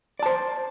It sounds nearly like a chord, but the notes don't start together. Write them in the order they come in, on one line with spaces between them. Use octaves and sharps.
D5 A5 C5